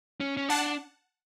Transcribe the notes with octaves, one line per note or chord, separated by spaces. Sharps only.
C#4
C#4
D4 F#5 A5